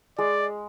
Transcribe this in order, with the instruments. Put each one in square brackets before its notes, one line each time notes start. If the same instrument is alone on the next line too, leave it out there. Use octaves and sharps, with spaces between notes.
[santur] G#3 [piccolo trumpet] D5